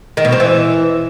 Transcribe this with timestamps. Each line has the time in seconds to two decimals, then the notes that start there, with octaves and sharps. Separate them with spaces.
0.17 D#3
0.25 B2
0.32 C4
0.40 E3